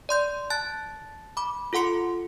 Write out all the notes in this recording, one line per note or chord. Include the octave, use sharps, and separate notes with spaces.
D5 C6 G6
A5 F#6 A6
B5 D6
F4 A4 F#5 C6 C#7